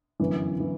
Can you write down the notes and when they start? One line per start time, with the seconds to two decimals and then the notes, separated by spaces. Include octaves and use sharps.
0.20 G1 F#2 E3
0.60 E3